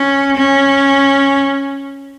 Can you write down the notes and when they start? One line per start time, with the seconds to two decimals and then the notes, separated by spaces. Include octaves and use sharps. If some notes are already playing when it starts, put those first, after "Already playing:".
Already playing: C#4
0.36 C#4